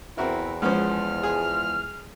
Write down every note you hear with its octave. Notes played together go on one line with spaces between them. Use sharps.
E2 C4 E4 F#4 A#4 E5
F3 G#3 B3 C#4 C5 F6
G#4